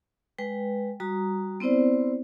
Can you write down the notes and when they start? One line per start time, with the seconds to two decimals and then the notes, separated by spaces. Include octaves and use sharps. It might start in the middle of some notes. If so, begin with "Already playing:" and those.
0.39 G#3 B4 G5
1.00 G3 F#4 A#5 D#6
1.60 B3 C4 E4 C5 D5